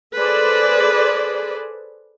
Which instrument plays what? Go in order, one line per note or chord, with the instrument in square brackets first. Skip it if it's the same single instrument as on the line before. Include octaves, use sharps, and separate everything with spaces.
[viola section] G#4 A4 B4 C5 D5